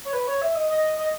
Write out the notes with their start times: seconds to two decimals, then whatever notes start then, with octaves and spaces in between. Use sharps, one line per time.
0.05 C#5
0.13 B4
0.27 C#5
0.42 E5
0.55 D#5
0.70 D#5
0.98 D#5